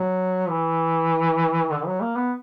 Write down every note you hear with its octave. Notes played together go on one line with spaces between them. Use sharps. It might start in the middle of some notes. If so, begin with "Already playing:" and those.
Already playing: F#3
E3
D3
F#3
A#3
B3